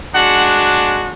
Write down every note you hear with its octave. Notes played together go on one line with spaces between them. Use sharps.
G#3 D4 F#4 F#5